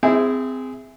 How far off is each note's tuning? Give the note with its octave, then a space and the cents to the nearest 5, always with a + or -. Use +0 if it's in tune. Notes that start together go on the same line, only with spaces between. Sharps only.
C4 -25 E4 +0 G#4 -10